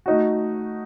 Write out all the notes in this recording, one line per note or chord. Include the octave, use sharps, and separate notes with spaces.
A3 D#4 F#4